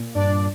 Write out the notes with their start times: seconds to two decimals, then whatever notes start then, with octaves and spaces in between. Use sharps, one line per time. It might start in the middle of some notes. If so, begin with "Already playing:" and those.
Already playing: A#2
0.15 G2 D4 D5